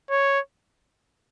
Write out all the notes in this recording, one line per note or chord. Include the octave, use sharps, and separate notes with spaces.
C#5